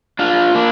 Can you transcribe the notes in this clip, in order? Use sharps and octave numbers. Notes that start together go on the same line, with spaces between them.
D4 F4
A#3 D4